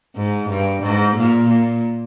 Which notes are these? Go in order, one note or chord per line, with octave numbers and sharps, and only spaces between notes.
G#2
G2
G#2
A#2
A#2